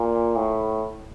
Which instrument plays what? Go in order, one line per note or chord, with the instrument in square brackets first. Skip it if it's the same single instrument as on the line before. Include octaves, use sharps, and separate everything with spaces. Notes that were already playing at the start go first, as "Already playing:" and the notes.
Already playing: [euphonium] A#2
A2